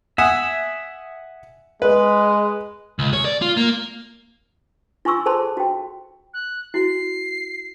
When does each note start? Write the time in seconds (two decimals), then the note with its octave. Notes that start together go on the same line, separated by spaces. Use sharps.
0.18 E5 F#5 G#5 D#6
1.82 G#3 B4
2.99 C#2
3.13 C#5
3.25 D5
3.42 F4
3.57 A#3
5.05 F4 G#5 C6 C#6 E6
5.26 G#4 A4 C5 A5 B5 C6
5.57 F#4 G5
6.34 F#6
6.74 E4 F#4 C7